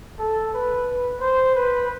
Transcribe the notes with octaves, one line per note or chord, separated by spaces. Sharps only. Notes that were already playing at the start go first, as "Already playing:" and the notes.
A4
B4
C5
B4